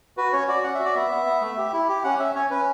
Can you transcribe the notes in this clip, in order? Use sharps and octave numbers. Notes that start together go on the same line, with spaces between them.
F#4 B4
C#4 C#5
F#4 D5
C#4 F#5
F#4 E5
D5
B3 E5
B3
B3
A3
G4
E4
G4
C#4 F#5
C#4 E5
C#4 C#5
C#4 B4